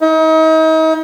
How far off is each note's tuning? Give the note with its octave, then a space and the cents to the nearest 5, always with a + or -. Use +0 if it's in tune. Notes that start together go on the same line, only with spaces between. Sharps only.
D#4 +40